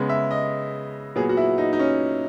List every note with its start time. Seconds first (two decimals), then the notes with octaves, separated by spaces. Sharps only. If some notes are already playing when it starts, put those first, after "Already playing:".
Already playing: C#3 G#3 B3
0.09 E5
0.31 D#5
1.16 A#2 F#3 B3 G#4
1.29 F#4
1.37 E4
1.58 D#4
1.73 D#4
1.79 C#4